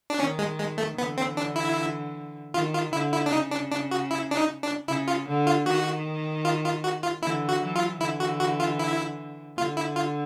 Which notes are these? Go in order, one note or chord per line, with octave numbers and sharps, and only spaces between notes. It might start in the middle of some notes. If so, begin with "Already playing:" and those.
D4
D#3 C#4
G#3
G#3
A3
D3 E3 B3
C4
D4
E4
D#3 F4
F4
D3 E4
E4
D4
C#3 D#4
D4
D4
F#4
E4
D4
D#4
D4
C#3 E4
F4
D3
F4
D#3 F#4
F4
F4
F#4
F4
D3 E3 E4
F#4
E3 F#3
F4
D3 E3 E4
F#4
F#4
F4
E4
D3 F4
E4
F4